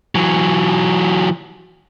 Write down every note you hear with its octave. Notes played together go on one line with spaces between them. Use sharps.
E3 F#3